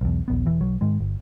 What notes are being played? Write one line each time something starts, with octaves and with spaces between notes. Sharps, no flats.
B1 E2
D#1 A#1 B3
E1 E3
B1 F#3
G#2 D#3 G#3
G1